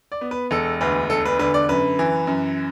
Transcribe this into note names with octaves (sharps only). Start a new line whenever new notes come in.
D5
B3
B4
E1 A4
D2 B4
E1 A4
B4
D3 B4
D5
F#2 B4
E3
F#2